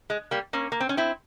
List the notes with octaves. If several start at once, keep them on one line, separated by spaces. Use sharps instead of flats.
G#3
G3 A#3
A#3 C#4
A#3
C4
C#4
C4 E4